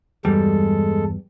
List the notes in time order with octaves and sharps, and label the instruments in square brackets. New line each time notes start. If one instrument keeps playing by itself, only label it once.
[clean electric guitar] E2 G2 [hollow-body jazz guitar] G3 [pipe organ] G#3 A4